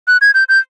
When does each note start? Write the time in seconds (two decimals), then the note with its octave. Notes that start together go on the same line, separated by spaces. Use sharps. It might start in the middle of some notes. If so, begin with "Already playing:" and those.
0.08 F#6
0.21 G#6
0.34 G6
0.49 G6